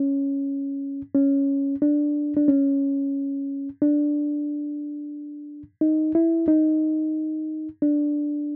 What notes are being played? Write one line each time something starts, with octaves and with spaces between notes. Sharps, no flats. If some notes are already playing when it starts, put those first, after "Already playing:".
Already playing: C#4
C#4
D4
D4
C#4
D4
D#4
E4
D#4
D4